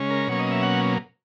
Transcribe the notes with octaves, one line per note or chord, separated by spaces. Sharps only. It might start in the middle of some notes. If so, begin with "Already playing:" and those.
Already playing: C#3 G#3 C#4
A#4
B2 F#3 A#3 C#4 C#5
D#5
E5
F#5